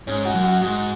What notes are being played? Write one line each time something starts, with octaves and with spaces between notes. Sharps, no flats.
G#2 C#4
F#4
F#2
F#4
G#2 F#4